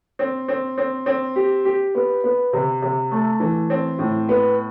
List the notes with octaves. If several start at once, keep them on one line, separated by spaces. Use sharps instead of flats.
C4
C4
C4
C4
G4
G4
B3
B3
C3
C3
A3
E3
C4
A2
B3